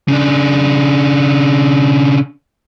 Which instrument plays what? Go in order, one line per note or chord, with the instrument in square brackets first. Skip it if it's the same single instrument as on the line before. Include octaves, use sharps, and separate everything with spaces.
[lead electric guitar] C#3 D4